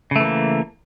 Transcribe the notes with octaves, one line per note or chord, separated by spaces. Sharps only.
C#3 E3 A3 A#3